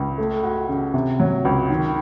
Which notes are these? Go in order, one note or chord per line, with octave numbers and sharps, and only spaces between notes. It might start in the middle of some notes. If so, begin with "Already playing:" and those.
Already playing: C#2
A3
F#4
C#3
C3
F#3
C#2
D#3